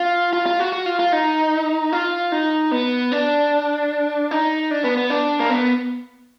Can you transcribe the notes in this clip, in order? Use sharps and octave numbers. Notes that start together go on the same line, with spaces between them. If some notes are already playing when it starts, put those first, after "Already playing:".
Already playing: F4
F4
F4
F#4
F#4
F4
F4
D#4
F4
D#4
B3
D4
D#4
D4
B3
B3
D4
A#3
B3